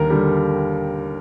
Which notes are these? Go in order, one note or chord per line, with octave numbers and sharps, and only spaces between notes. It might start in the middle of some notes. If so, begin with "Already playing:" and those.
Already playing: D#2 D3 G3 A#4
D3 G3